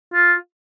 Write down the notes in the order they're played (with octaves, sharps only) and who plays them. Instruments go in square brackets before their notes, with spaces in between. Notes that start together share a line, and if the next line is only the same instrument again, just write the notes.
[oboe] F4